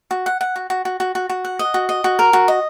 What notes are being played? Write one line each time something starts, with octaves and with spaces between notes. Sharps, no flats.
F#4
F#5
F#5
F#4
F#4
F#4
F#4
F#4
F#4
F#5
D#5
F#4
D#5
F#4
A#4
F#4
D#5